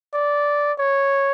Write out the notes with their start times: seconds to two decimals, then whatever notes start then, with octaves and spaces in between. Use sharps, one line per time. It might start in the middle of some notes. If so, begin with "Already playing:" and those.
0.14 D5
0.79 C#5